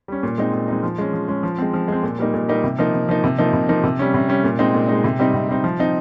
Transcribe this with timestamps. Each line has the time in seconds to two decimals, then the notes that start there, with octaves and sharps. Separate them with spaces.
0.08 G3 C#4
0.23 A#2
0.38 G#3 C4 D#4
0.53 A#2
0.68 G#3 C4 D#4
0.83 F3
0.98 G#3 C#4
1.13 F3
1.28 G#3 C#4
1.43 F3
1.58 G#3 C4
1.74 F3
1.88 G#3 C4
2.03 A#2
2.19 G3 A#3 D#4
2.34 A#2
2.49 G3 A#3 D#4
2.64 C3
2.79 F3 A#3 D#4
2.94 C3
3.09 F3 A#3 D#4
3.24 C3
3.38 F3 A#3 D#4
3.53 C3
3.69 F3 A#3 D#4
3.84 C3
3.99 G3 C#4
4.14 C3
4.29 G3 C#4
4.44 A#2
4.59 G#3 C4 D#4
4.74 A#2
4.89 G#3 C4 D#4
5.04 C3
5.19 G3 C4 D#4
5.34 C3
5.49 G3 C4 D#4
5.64 F3
5.79 C4 D#4